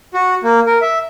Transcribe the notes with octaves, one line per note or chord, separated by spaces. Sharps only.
F#4
A#3
A#4
E5